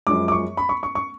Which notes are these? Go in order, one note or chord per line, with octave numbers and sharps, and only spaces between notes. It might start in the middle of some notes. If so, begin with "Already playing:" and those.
F#2 F3 G#3 D6
D6
C#6
B5
C#6
C#6
C#6